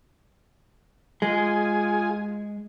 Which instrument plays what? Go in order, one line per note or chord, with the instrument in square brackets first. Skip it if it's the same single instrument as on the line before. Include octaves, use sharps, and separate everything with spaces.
[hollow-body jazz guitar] G#3 [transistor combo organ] F4 G#4 G#5